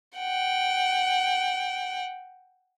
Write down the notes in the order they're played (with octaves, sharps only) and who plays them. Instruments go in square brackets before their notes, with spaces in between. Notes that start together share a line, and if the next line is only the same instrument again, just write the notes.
[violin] F#5 G5